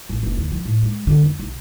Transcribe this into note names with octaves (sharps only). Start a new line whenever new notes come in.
A1
F#1
D2
F3
A2
G#3
D3
F2
B1